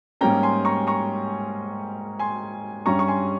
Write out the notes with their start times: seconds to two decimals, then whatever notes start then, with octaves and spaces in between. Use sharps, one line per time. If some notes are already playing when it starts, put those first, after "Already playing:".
0.21 G#2 G3 A#3 C#4 G5 A#5
0.43 G#5 C6
0.65 A#5 C#6
0.87 A#5 C#6
2.19 G#5 C6
2.86 G2 G3 C#4 A#5 C#6
2.99 C#6
3.08 G#5 C6